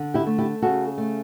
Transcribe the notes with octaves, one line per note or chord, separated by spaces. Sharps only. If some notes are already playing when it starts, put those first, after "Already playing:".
Already playing: D3
E4 G4
A3
E4 G4
C#3 F#4 A4
A3